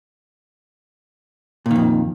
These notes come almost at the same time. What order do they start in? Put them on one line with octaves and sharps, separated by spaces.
A#2 D#3 F2